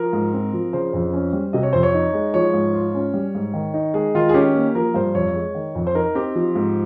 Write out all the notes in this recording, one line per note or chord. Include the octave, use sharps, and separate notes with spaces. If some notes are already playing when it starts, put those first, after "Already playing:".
Already playing: F3 A#4
G#2
C4
F3
C#3 C5
F2
C#4
G3
C3 D#5
C#5
F2 C5
C#5
D#4
G#3
F3 C#5
G#2
F4
C#4
G3
G#2
D#3
D#4
G#3 G#4
D#3 F4
G#4
C#4 G4
A#3
F3 A#4
G2 C5
F2 C#5
G#3
D#3
F2
C5
D#4 A#4
C4 G4
F3
G#2